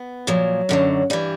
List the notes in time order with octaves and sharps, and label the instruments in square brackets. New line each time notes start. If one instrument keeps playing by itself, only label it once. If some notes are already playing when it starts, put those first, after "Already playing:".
Already playing: [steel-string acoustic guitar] B3
A#2 F3 F#3
F#2 D3 F#3
G2 E3 G3